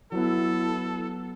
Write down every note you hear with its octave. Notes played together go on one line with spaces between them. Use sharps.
F#3 B3 E4 A4